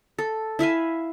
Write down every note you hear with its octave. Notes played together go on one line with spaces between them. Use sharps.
A4
E4 E5 F5 G#5